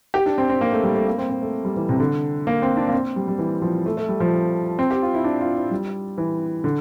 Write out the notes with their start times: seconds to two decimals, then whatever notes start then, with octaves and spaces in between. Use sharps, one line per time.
0.14 G4
0.26 D4
0.38 C4
0.50 C4
0.61 A#3
0.73 A3
0.83 G3
0.96 A3
1.07 A#3
1.18 C4
1.30 C4
1.42 A3
1.65 G3
1.76 E3
1.89 C3
2.00 D3
2.47 A#3
2.62 C4
2.77 D4
2.88 A#3
2.92 C4
3.16 G3
3.28 G3
3.39 E3
3.62 F3
3.86 A3
3.97 A3
4.09 G3
4.20 F3
4.79 C4
4.91 G4
5.02 F4
5.14 E4
5.24 D4
5.41 F4
5.56 E4
5.71 G3
6.18 E3
6.64 D3